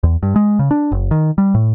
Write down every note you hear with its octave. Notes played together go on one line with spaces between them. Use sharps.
E2
G2
G#3
C#3
D4
F#1
D#3
G3
A2